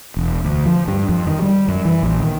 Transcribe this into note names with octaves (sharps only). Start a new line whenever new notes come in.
E1
D2
F3
G2
F2
D#3
G3
F#2
E3
A#1
D#3